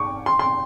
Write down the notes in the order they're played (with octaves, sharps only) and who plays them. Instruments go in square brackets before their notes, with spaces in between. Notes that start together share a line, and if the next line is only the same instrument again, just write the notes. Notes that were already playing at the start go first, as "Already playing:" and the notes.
Already playing: [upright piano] C#6 D6
C6
C6